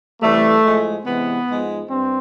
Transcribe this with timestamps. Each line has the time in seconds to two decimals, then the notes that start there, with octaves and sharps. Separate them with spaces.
0.21 C3 E3 G3 A3
0.63 A2 F3 G#3
1.05 C3 E3 G#3 B3
1.48 G#2 F3 G#3
1.89 G2 C4